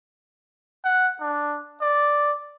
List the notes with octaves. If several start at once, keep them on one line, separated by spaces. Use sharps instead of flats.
F#5
D4
D5